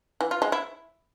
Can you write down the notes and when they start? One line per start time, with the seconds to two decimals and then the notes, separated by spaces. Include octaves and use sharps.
0.21 E3
0.31 F4
0.42 G#3
0.52 E4